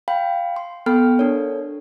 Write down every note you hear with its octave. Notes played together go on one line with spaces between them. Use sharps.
F5 G5 B5
C6
B3 A4 G5 B5 F6
D4 A4 A#4 C#5